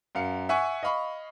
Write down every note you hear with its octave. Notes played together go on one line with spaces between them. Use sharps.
F#2 F5 C#7
E5 F#5 G#5 C#6
D#5 F5 B5 C#6